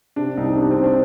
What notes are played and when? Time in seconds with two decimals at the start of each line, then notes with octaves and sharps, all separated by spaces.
0.16 C3 D4
0.37 C2 D#4
0.56 C3 D4
0.71 C4
0.77 C3
0.83 D4